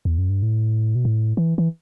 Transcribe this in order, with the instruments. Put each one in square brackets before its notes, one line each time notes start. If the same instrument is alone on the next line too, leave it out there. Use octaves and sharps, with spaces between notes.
[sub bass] E2
F#2
G2
A2
B2
A2
E3
E3